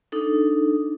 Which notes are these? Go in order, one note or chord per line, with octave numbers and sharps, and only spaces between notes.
D4 D#4 A4